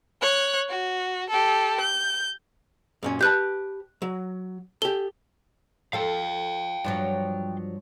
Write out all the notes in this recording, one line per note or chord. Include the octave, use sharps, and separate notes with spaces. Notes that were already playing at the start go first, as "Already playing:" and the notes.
C#5 F#6
F#4
G4 A4
G6
F#2 A#2 C#4
G4 B4 A5 F#6 G6
F#3
G4 A4 G7
F3 A4 F5 G5
G2 F3 F#3